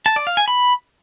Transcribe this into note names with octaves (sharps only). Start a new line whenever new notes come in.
A5
D5
F5
G#5
B5